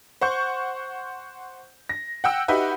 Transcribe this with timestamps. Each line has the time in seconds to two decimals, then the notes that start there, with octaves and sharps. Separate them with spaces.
0.21 C5 F#5 C#6 G6
1.89 A#6
2.24 F#5 G5 E6
2.48 D#4 F#4 G4 B4 E5